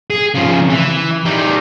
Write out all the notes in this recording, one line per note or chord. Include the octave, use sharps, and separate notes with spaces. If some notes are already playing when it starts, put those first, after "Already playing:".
G#4
C#3 F3
E3
G3 D#4